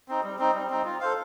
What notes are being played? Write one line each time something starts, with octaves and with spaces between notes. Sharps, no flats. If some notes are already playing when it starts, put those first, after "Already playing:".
C4 D#4
G3
C4 D#4
G3
C4 D#4
F4
A4 C5 F5